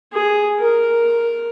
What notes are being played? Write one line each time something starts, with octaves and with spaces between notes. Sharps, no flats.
G#4
A#4